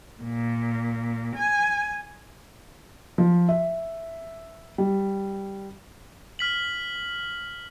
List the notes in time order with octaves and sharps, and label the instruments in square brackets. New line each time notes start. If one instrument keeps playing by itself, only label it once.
[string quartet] A#2
G#5
[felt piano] F3
E5
G3
[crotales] F6 B6 F#7